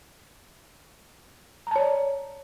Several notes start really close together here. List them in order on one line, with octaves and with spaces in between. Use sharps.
A#5 A5 C#5 D5